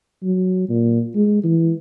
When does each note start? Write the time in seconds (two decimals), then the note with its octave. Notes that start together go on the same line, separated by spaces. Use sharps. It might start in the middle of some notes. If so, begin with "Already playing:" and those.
0.23 F#3
0.69 A#2
1.15 G#3
1.44 E3